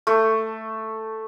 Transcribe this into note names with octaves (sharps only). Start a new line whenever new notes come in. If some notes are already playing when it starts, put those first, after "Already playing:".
A3